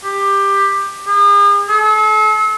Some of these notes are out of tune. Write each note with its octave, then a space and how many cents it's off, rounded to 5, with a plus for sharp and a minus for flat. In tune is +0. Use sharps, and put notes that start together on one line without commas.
G4 +15
G#4 -45
A4 -40